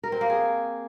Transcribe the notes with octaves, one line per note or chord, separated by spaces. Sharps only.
A#4
C4
A#3
G#4